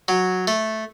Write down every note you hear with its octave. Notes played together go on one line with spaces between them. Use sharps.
F#3
A3